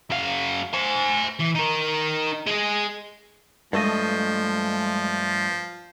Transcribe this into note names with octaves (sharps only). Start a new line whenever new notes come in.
F#2 F5
C5 G#5
E3
D#4 A#4
G#3 G#4
G2 F3 G#3 A3 D#5